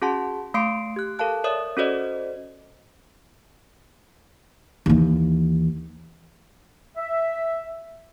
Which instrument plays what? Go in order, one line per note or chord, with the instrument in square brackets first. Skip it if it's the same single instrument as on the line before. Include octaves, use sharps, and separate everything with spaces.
[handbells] C#4 F#4 G#4 F#5 A5 C6
A3 F5 C6 D6 C7 D7
G4 F#6
A4 A#4 F5 A5 F#6
A#4 C#5 D5 E5 D#6
C#4 F#4 A4 C5 D5 D#5
[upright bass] D#2 E3
[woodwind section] E5